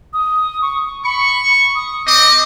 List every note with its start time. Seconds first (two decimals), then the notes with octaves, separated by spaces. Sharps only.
0.13 D#6
0.62 C#6
1.05 B5 C#6
1.75 D#6
2.06 C4 D#5 D6